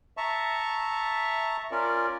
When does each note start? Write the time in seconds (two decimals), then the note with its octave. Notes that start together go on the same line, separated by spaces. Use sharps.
0.17 E5 A5 A#5 C#6
1.71 C#4 F4 A#4 D5